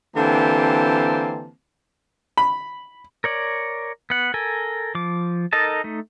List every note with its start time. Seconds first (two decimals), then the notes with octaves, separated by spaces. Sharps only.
0.17 D3 E3 A#3 C4 G4 A5
2.37 B5
3.24 A#4 C#5 D5
4.10 B3 F#5
4.34 A4 A#4 G#5
4.95 F3 D6
5.53 D#4 A4 A#4 D#5 A5
5.84 A3 D#4